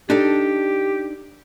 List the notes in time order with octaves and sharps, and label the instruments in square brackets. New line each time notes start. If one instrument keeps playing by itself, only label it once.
[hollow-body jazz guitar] D4 D#4 A4 [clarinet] G4